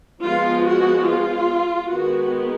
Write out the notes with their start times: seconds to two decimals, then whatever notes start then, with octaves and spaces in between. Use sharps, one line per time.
0.24 F3 G#3 B3 F4
0.65 F#4
1.07 F4
1.89 D#3 G#3 B3 F#4